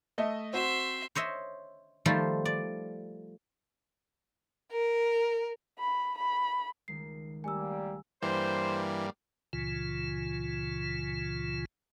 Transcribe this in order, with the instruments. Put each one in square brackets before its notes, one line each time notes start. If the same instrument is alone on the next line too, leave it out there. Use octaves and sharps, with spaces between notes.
[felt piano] A3 D#5 E5
[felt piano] C4 F#4 [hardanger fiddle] E5 C6
[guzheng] C5 C#5 D#5 E5
D#3 F3 G3 A3 F4 C5
D5
[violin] A#4
[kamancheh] B5
B5
[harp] C#2 D#3 G#3 [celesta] C7
[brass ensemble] G3 A#3 [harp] A3 [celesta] G#5 E6
[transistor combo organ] G2 G3 A#3 [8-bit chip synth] E3 [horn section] C5
[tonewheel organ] C#2 A#2 C#3 E3 F4